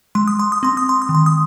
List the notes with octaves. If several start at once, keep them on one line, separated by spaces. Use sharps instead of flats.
G#3 C6
D#6
C6
D#6
C4 C6
D#6
C6
D#6
D#3
C6
D#6